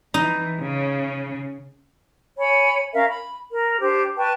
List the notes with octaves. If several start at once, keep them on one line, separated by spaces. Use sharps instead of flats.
E3 D#4
C#3
C#5 G#5 B5
C#4 A#4 E5 F5
B5
A#4
D4 G4 C5
B4 G5 A5 C#6